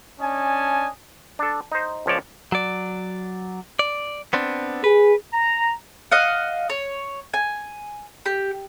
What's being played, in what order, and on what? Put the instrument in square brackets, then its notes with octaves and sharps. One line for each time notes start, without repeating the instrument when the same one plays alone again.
[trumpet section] C#4 D4 D#5 G#5 A5
[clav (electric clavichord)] D4 A4
D#4 C5
C#2 F3 C#5 D5 A5
[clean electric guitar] F#3 D5
D5
B3 C4 D4
[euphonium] G#4 [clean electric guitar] B4
[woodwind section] A#5
[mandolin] D#5 F5 F#5
C#5
G#5
G4